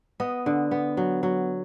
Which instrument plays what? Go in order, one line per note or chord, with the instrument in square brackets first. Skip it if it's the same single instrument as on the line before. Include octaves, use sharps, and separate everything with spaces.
[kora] B3 D#5
D3
B3
F#3
F#3